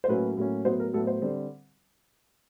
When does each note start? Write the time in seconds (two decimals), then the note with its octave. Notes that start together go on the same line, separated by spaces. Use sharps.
0.04 C5
0.08 A2 F#3 A#3 C#4 B4
0.37 A2 F#3 A#3 C#4
0.65 A2 F#3 B3 C5
0.80 A#4
0.93 A2 F#3 B3 A4
1.07 C5
1.22 D3 G3 C4